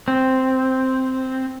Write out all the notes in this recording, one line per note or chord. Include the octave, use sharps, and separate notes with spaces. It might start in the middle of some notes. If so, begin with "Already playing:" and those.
C4